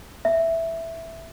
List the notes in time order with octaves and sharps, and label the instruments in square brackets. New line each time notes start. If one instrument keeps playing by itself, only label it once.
[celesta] E5